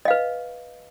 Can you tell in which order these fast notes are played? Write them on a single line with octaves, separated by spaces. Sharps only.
D#5 F5 B4